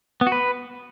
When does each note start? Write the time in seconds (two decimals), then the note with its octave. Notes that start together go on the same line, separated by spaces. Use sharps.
0.21 B3
0.27 F#4
0.32 B4